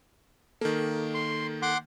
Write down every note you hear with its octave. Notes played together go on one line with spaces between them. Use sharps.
D#3 A#3 A4
C6
F#5 C6 D6